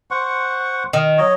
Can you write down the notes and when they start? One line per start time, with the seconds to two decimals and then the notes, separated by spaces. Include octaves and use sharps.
0.11 C5 F#5 C#6
0.93 D#3
1.18 F#3 C#5 D#5